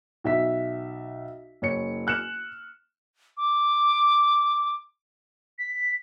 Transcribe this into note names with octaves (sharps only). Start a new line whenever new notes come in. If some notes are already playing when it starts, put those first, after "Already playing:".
B1 E5 B6
F#1 C#5 C#7
F6 F#6 C#7 E7
D6
B6